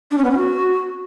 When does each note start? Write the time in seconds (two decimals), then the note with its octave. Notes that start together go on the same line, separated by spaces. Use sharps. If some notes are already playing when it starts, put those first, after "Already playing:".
0.11 D4
0.18 C#4
0.24 B3
0.31 C#4
0.37 F#4